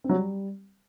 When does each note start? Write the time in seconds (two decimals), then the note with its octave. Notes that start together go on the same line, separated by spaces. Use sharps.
0.04 C4
0.09 F#3
0.15 G3